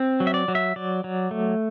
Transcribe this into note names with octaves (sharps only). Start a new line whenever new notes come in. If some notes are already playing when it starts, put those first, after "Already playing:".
Already playing: C4
F#3
E5
D5
F#3
E5
F#3 D5
F#3
A3